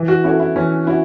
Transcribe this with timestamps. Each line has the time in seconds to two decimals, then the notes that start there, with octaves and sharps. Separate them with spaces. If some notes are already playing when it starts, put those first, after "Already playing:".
Already playing: E3
0.08 F#4
0.24 C#4 E4 F#4 A4
0.40 E4
0.56 E3 C#4
0.86 C#4 E4 F#4